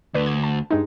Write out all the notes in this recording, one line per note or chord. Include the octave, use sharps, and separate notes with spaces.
D2 D4 B4
G#6
A5
G2 G#3 D#4